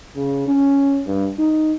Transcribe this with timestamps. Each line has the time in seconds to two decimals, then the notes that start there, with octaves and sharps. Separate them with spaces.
0.16 C#3
0.48 C#4
1.06 G2
1.38 D#4